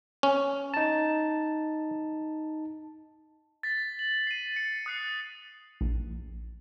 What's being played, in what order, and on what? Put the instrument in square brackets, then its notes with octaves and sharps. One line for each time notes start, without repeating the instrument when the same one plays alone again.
[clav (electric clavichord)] C#4
[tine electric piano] D#4 A5
[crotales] A6 B6
F#7
C7 D#7
B6 C#7
D#6 F#6 C7 C#7
[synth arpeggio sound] A#1